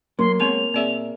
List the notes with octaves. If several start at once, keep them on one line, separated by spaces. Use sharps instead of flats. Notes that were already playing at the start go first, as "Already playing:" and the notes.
F#3 A#3 C6
G#3 B3 C4 C#5 C6 F7
A#2 C4 G#4 D5 E5